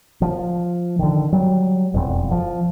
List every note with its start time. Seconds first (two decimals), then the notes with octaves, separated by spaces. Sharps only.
0.22 F3
0.99 D3 D#3
1.32 F#3 G3
1.94 E1 F2
2.31 F3